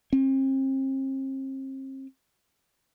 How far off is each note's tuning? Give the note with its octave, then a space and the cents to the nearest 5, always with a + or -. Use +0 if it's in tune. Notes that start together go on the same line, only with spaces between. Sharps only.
C4 +35